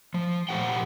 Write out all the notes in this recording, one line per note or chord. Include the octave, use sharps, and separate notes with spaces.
F3
A#2 F3 B3 G4 F#5 G5